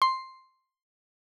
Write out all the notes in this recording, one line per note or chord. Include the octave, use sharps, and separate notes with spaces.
C6